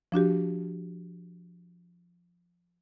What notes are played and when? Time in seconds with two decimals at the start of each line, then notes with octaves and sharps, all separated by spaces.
0.12 F3 D4 F#4 G4